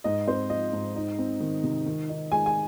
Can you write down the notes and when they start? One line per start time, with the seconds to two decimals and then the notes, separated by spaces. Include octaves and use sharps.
0.04 G#2 D#5
0.27 C4 C5
0.50 F3 D#5
0.73 G#2
0.96 D#4
1.19 C4
1.40 D#3
1.64 C3
1.86 D#3
2.09 D#4
2.32 G#3 G#5
2.46 G#5